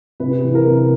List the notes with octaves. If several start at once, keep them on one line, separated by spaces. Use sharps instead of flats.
C3 B4
E3
A#4
C3